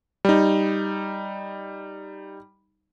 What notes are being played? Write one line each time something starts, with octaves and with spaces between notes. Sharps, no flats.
G3 D#4